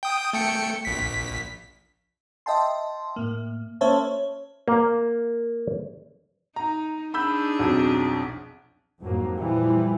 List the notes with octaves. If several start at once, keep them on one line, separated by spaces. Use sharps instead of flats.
G5 D#6
A3 G5 C#7
A#1 B6
D#5 E5 G5 A5 C6
A2 A#3
A#3 C#4 C5 C#5 E5 A5
C#5
A#3
D#4 A#5
D4 D#4 G#4 B5 E6 G6
B1 F2
F2 G#2 F#3 A#3
A#2 E3 F3 G3